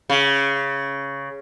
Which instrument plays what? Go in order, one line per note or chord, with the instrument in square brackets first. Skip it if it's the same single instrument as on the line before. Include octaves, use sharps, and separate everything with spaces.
[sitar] C#3